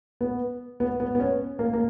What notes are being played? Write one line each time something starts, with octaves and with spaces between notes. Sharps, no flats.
B3
B3
B3
B3
C#4
A#3
A#3